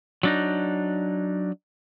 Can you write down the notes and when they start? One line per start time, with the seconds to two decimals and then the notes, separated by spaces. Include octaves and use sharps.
0.23 F#3 D4 D#4